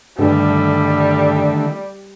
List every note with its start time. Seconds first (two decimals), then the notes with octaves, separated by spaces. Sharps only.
0.19 G2 D3 D#3 G3 A3